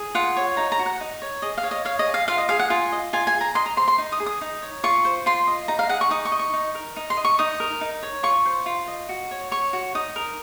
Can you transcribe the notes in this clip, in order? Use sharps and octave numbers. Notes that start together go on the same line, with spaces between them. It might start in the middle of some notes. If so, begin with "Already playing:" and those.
Already playing: G#4
F4 F#5
C#5
D#4 A#5
A#5
F#4
F#5
D#4
C#5
G#4 D#5
F5
C#5
D#5
C#5 F5
D#5
G#4
F5
F4 F5
D#5
G#4 F5
F#5
F4 G#5
D#5
F4 G#5
G#5
G#4
A#5
D#5 C6
A#5
C5 C6
C6
D#4
D#6
G#4
D#6
D#4
C#5
F4 C#6
C5
F4 C6
D#5
D#4 A#5
F5
G#4 F#5
C#6
D#4 D#6
C#6
D#5
C#6
D#4
A#4
D#4
C6
D#5
C#6
D#4 D#6
A#4
D#4
C#5
F4 C#6
C5
F4
D#5
F#4
C#5
C#5 C#6
F#4
D#4 D#6
A#4